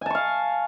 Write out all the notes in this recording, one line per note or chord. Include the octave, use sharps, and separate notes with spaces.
F5 G#5 A5 C#6